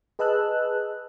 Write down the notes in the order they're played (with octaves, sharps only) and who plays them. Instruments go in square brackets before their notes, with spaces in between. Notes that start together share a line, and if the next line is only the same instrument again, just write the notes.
[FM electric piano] G#4 B4 D#5 A5 E6 F#6